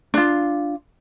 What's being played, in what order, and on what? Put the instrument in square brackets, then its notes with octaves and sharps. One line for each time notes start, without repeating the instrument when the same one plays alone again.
[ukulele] D4 F4